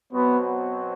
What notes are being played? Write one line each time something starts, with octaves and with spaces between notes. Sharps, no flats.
B2 F#3 B3 C4 F#4 C5